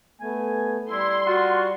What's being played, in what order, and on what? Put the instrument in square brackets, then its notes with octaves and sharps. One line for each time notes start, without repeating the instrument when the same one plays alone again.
[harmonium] A3 B3 [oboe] G#5
[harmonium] G3 [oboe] E4 [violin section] C6
[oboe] F4 [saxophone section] F#4